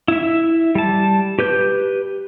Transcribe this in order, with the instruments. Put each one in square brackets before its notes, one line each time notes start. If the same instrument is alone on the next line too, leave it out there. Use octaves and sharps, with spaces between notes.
[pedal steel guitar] E4 E5
G3 A5
G4 B4 G6